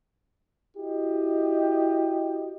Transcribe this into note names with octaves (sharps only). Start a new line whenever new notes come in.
E4 F#4 G4 D#5